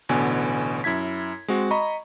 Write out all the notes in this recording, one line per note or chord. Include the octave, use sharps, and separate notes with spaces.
A1 B2 D3 B3 G#5
F#2 E4 G#6 B6
G#3 C4 F#4
D#5 A#5 B5 C#6